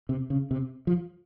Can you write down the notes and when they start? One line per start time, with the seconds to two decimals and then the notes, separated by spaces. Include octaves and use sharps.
0.09 C3
0.30 C#3
0.51 C3
0.87 F3